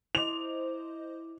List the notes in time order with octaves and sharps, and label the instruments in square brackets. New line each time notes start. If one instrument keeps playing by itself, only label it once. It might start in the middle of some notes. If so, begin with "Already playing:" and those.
[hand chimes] E4 D6 [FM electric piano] C5 D#5 [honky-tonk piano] F7